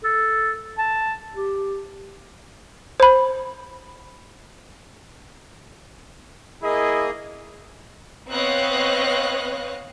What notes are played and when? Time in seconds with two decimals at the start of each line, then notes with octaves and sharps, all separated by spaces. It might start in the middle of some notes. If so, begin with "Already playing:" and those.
0.04 A4
0.78 A5
1.35 G4
3.00 C5 B5
6.63 A#3 E4 G#4 D#5
8.30 B3 C4 C#5 D#5 F5 F#6